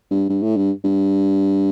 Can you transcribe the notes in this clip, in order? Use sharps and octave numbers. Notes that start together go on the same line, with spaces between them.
G2
G2
A2
G2
G2